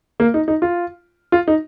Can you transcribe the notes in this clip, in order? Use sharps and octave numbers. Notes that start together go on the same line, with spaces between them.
A#3
D#4
D#4
F4
F4
D#4